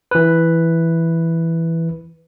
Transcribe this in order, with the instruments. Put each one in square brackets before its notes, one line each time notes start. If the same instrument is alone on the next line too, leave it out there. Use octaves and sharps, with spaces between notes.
[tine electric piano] E3 B4